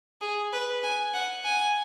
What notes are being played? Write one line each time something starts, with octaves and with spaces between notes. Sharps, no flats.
G#4
B4
G#5
F#5
G#5